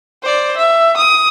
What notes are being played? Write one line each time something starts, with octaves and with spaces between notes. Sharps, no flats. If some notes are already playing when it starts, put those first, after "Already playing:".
C5 D5
E5
D#6